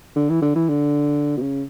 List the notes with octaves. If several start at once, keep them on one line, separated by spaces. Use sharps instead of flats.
D3
E3
D3
E3
D3
B2
C#3